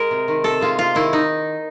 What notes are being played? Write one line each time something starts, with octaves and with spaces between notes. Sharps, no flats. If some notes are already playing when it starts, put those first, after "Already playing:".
Already playing: G#3 A#4
C3
D#3
C3 A4
G#3 F4
C3 F4
D#3 E4
D#4